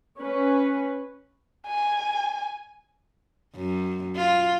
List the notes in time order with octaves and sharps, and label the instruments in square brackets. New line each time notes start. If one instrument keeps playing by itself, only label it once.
[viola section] C#4 B4
[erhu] G#5
[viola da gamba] F#2
F4